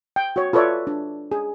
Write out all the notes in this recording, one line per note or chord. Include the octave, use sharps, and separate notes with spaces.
G5
F#4 C#5
F4 A4 B4 C#5 D5 E5
D4
G#4